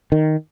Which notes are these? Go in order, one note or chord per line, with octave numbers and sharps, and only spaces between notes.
D#3